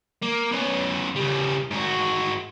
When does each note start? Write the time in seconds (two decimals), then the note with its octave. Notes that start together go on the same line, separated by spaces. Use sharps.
0.22 A#3
0.52 B3 C#4
1.16 C#3 G3
1.70 G#2 F#4